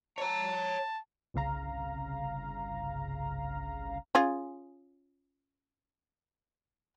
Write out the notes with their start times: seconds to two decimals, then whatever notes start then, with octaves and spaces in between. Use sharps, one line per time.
0.18 C#5 A5 A#5
1.34 G1 C2 C#3 F5 A#5
4.15 C#4 F4 G#4